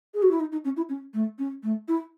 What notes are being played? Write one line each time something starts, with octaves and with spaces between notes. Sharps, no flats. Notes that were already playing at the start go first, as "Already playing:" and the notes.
G#4
F#4
E4
D#4
D#4
C#4
E4
C#4
A3
C#4
A3
E4